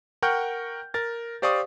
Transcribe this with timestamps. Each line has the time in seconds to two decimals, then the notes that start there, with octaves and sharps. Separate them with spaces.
0.22 A#4 F#5 G5 C#6 F6 G6
0.94 A#4 A6
1.42 G4 C5 D5 F5 C#6 D#6